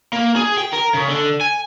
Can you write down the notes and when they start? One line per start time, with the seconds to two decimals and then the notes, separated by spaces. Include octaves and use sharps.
0.13 A#3
0.36 G#4
0.57 G5
0.73 A#4
0.94 C#3
1.09 D3
1.41 G#5